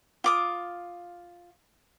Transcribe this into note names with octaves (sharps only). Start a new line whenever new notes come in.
F4 D6 D#6